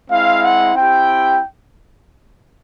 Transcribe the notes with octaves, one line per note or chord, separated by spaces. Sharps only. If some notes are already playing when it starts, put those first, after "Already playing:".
G#3 C4 E4 F5
F#5
C4 E4 G4 G5